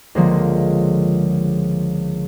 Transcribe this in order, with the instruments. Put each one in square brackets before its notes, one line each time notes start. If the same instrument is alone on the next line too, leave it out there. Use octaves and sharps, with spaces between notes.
[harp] C#2 D3 F3 G#3 A#3